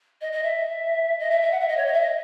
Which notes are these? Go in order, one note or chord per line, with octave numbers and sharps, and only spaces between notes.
D#5
D#5
E5
D#5
E5
E5
F#5
E5
D#5
C#5
D#5
E5
D#5